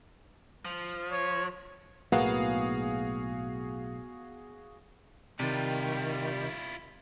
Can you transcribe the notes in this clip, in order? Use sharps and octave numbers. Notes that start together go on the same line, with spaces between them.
F3
C#5
B1 A2 A#3 B3 F#4 G#4 F5
C3 D#3 G3 E4 F4